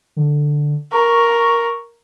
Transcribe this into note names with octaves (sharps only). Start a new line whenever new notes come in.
D3
A#4 C#6